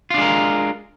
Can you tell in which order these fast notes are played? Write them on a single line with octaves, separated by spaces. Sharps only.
F4 D4 G#3 A#4